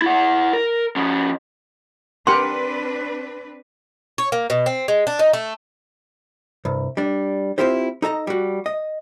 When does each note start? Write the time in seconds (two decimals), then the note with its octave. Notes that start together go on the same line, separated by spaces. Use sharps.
0.02 E4 F#5
0.53 A#4
0.96 F3 C#4
2.27 C4 D4 G4 A#4 B4 F#5 C6
4.18 C#5
4.32 A#3
4.50 B2
4.66 C4
4.88 G#3
5.07 D4
5.19 D#4
5.33 A3
6.65 C2 G2
6.97 G3 D4
7.58 C4 D4 E4 F4 G4 C5
8.02 D#4 A4 D#5 A#5
8.27 G3 F#4
8.66 D#5